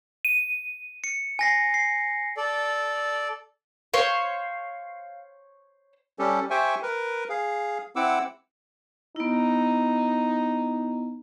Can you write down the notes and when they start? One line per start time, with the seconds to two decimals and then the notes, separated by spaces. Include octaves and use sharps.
0.25 D#7
1.04 C#7
1.39 G#5 A#6 C7
1.74 C7
2.37 A4 D5
3.94 C5 C#5 F5
6.19 G3 C#4 G4 A4
6.50 G4 C5 E5 G5 G#5 C#6
6.83 A#4 B4
7.29 G#4 F5
7.96 C4 E4 F#5 D6 E6
9.16 B3 D#4 E4